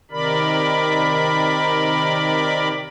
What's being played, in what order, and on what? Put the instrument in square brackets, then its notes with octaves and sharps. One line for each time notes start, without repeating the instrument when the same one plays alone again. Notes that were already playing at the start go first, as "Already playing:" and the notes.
[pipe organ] C3 D#3 A#4 D5 B5